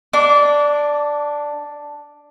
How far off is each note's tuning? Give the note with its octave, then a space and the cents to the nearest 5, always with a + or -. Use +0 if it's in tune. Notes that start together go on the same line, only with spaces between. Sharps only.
D4 +0 D6 -25